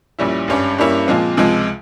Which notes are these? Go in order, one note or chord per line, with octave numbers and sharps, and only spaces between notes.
A#1 A#2 G3 C#4 E4
G#1 G2 G3 C#4
G2 G3 A#3 C#4 E4
A#2 F3 G#3 C4 F4
C#2 C3 F3 G#3